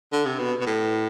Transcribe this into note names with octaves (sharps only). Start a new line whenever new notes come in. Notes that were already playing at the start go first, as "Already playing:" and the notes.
D3
C3
B2
B2
A2